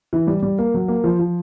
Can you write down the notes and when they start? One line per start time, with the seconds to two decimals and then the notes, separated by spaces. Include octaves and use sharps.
0.13 E3
0.27 G3
0.42 G3
0.59 A#3
0.74 F#3
0.88 A#3
1.04 F3
1.19 F3